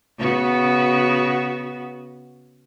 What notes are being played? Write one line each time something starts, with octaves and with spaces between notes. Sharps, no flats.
C#3 B3 F#4